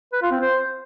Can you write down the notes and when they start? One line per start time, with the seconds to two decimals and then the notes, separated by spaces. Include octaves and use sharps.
0.13 B4
0.22 F4
0.32 C4
0.41 C5